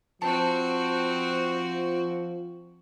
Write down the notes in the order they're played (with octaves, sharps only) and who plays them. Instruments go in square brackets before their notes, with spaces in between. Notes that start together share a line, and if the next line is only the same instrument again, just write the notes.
[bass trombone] F3 [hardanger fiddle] C4 F#4 [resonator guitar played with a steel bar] A5